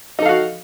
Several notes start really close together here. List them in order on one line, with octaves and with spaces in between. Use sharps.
D#4 A4 F5 F#4